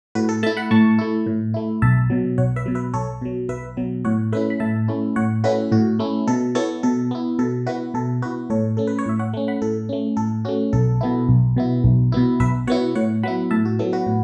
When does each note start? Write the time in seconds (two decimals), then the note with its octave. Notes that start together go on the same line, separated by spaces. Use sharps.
0.15 A2 F#4 B4
0.29 A4
0.43 A3 E5 A5
0.47 E4
0.57 F#5 B5
0.71 A2 A5 C#6
0.99 A3 E4
1.26 A2
1.54 A3 E4
1.82 B1 E5 A5
2.10 B2 F#3
2.38 B1 C#5 F#5
2.56 B4 E5
2.66 B2 F#3
2.75 B4 E5
2.94 B1 A4 C#5
3.22 B2 F#3
3.49 B1 B4 E5
3.77 B2 F#3
4.05 A2 C#5 F#5
4.32 A3 C#4 E4 B4 E5
4.50 B5
4.60 A2 E5 A5
4.88 A3 C#4 E4
5.16 A2 C#5 F#5
5.44 A3 C#4 E4 F#4 B4
5.72 A2 F#4
5.99 A3 C#4 E4
6.28 B2 A4
6.55 B3 E4 A4 C#5
6.83 B2 A4
7.11 B3 E4
7.39 B2 A4
7.67 B3 E4 F#4 B4
7.94 B2 A4
8.22 B3 E4 F#4 B4
8.50 A2 A4 C#5
8.77 A3 C#4 A4
8.87 B4
8.99 C#5
9.06 A2 E5
9.19 C#5 F#5
9.34 A3 C#4
9.48 F#5 B5
9.62 A2 A4
9.89 A3 C#4
10.17 A2 A4
10.45 A3 C#4 F#4
10.73 B1 A4
11.01 B2 B3 E4
11.29 B1
11.56 B2 B3 E4
11.84 B1
12.12 B2 B3 E4
12.40 B1 B4 E5
12.67 B2 B3 E4 C#5 F#5
12.95 A2 C#5 F#5
13.23 F#3 B3 E4 F#5 B5
13.51 A2 E5 A5
13.65 F#4
13.79 F#3 B3 E4 A4
13.93 F#4 B4
14.07 A2